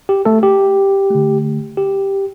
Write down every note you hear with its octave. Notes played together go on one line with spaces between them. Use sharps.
G4
A3 A4
G4
D3 A3
G4